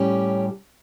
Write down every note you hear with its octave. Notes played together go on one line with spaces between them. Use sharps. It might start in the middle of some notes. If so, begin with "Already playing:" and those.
Already playing: A2 G3 C#4 G4